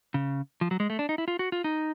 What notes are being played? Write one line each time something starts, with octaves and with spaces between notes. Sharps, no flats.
C#3
F3
F#3
G#3
A3
D4
D#4
E4
F4
F#4
F4
D#4